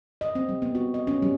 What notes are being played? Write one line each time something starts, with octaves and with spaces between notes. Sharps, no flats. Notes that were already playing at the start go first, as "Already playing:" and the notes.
D#5
C4
G3
B3
F#4
D#5
C#4
G3